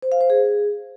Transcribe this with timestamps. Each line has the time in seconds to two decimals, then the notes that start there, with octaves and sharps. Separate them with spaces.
0.02 C5
0.12 F5
0.21 C5
0.30 G#4